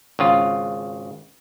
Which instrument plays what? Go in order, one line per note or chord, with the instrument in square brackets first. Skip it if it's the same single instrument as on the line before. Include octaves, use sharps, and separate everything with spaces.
[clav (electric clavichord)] G#1 C#3 F4